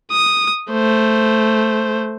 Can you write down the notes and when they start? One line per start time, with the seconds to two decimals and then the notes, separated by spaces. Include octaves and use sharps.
0.12 D#6
0.71 A3 C5